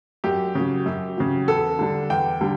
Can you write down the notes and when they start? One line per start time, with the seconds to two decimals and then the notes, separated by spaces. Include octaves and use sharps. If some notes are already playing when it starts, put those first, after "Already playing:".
0.24 F#2 G4
0.55 C#3 F#3
0.86 F#2
1.17 C#3 F#3
1.47 E2 A4
1.79 D3 G3 D4
2.10 E2 G5
2.41 D3 G3 D4